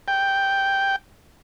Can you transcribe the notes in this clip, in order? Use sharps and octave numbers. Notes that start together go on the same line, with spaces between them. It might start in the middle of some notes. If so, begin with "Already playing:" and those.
G5